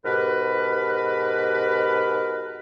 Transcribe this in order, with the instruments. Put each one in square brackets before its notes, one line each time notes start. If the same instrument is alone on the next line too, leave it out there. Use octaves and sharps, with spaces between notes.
[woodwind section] G#2 B2 G4 A#4 B4